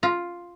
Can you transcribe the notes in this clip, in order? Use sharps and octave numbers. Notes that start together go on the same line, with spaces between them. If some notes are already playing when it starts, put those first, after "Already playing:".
F4